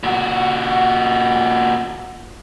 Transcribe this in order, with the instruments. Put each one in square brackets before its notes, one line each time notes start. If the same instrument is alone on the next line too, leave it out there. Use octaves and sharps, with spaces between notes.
[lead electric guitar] A#2 F#4